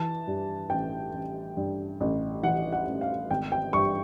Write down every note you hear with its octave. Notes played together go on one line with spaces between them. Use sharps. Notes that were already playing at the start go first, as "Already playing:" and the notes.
Already playing: E3 A5
G2
A1 G5
A1
G2
A1
E3 F#5
F#5
A1
F5
G#1 G5
G5
G2 C#6